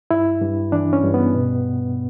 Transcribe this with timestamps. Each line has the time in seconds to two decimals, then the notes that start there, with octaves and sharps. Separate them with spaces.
0.11 G2 E4
0.42 G2
0.72 E3 D4
0.93 C#4
1.03 G2
1.14 B3
1.34 B2